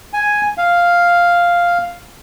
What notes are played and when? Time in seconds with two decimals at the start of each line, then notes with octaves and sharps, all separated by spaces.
0.14 G#5
0.58 F5